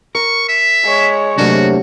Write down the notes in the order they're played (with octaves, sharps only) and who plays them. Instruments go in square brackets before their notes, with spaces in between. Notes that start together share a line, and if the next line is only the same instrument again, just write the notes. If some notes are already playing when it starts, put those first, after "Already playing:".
[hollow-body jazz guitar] A#4 [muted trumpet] C#6
[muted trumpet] E5
[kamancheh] G#3 C#5
[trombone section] C3 F#3 [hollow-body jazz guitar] A3 A#3 D4 [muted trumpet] F#4